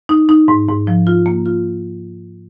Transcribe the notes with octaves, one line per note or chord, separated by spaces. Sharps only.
D#4
D#4
G#2
G#2
F3
F4
A#3
F4